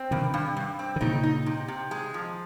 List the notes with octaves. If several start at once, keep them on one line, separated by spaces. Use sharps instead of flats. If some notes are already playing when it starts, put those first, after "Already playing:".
Already playing: C4
G2 C3 D#3
G2
G2
C4
D#3
A#2 C#3 D#4
D#4
C3
C3
G#3
F3